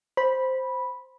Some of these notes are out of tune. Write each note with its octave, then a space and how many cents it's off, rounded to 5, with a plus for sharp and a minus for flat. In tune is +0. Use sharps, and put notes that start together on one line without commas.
C5 +0 B5 -10